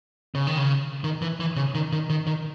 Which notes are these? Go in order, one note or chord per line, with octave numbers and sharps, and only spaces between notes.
C#3
D#3
C#3
D#3
E3
E3
C#3
D#3
D#3
D#3
D#3